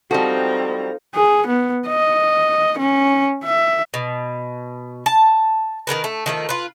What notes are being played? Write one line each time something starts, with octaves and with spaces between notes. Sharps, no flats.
F3 G3 C4 D#4 F#4 A4 A#5
G#4
B3
D#5
C#4
E5
B2
A5
D#3 G3 A#4 B4
A3
D#3 F3 A3
F4 B4